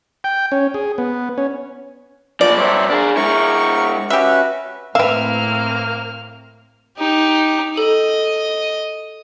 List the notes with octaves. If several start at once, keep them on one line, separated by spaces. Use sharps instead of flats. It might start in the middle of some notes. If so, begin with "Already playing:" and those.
G5
C#4
G#4
B3
C#4
F3 A#3 D5
G2 A#4 C5 C#5 E5
D4 G#4 A#4
G#3 E4 A#4 C#6
C#4 F#4 G4 B4 E5
A2 A#3 C4 B4 E5 F5 G5 F6
D#4 G4
A4 D#5